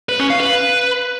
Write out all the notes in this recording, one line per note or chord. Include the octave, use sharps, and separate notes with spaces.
B4
C#4
F5
B4